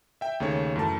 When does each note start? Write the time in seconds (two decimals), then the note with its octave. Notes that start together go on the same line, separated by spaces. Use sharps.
0.21 E5 G5
0.40 D#2 C#3 A3 C#5
0.76 F#2 E3 A3 A5